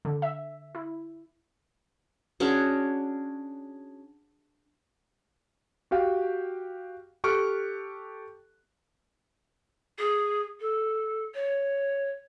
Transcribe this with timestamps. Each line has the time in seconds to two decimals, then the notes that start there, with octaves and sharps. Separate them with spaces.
0.05 D3
0.22 E5
0.75 E4
2.40 C#4 D4 F#4 G#4
5.91 F#4 G4 F5 G5
7.24 G4 A4 C#6 F6 F#6 D7
9.98 G#4
10.60 A4
11.34 C#5